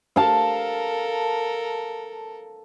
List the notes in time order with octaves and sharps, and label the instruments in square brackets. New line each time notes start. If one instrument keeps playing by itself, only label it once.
[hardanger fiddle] A4 A#4 [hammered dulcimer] F5 A5